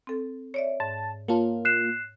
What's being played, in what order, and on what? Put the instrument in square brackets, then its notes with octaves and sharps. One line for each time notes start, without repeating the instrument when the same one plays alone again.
[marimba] C4 A4
C#5 D5 E5
[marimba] G#2 [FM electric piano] A5
[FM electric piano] A#3 F4 [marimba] C#5 A5
[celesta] F#6 C7 E7